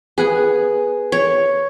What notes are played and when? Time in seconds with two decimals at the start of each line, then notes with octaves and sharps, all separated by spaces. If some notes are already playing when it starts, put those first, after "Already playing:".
0.18 B3 G#4 F#5 G#5
1.12 C#5